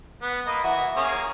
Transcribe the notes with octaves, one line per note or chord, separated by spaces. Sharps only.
B3
A#3 D#5 B5
E3 F#4 E5
A#3 C#4 G#4